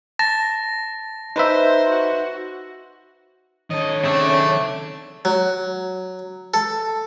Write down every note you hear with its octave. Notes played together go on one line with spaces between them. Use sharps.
A5 A#6
D#4 B4 C5 E5
F#4
D#3 A4 C#5 D#5
C#3 A3 C4 D4
F#3
A4